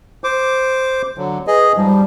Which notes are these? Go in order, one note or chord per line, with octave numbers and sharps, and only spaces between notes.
C5 D6
D3 F#3
G#4 B4 D#5
G#2 F3 G3